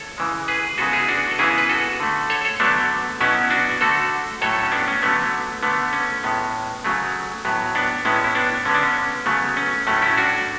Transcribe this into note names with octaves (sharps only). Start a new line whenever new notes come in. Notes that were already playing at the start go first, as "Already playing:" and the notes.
Already playing: A4 C#5
C#3 E3 G#3
G#4 B4
C#3 G#3 B3 F#4 A4
E4 G#4
D4 F#4
A4
C#3 E3 G#3 B3 E4 G#4
B4
F#4 A4
D3 A3
A4 C#5
A4 C#5
D3 F#3 A3 B3 D4
B2 F#3 B3 C#4 E4
D4 F#4
D3 A3 F#4 A4
A2 F#3 A3 A4 C#5
C#4
B3 D4
C#4
D3 F#3 A3 B3
D3 A3 B3
C#4
A2 G#3 B3
C#3 F#3 A3
A2 F#3 B3
B3 D4
A2 G#3 B3 C#4 E4
E4
B3 D4
D3 G#3 B3 C#4
D4
C#4
C#3 F#3 A3 B3
C#4
A2 F#3 A3 C#4
C#4 E4
D4 F#4